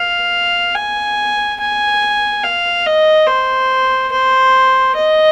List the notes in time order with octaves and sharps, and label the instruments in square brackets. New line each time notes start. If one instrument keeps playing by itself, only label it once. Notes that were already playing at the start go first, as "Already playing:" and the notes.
Already playing: [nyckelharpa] F5
G#5
G#5
F5
D#5
C5
C5
D#5